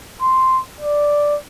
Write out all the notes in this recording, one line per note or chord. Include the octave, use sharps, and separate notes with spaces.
C6
D5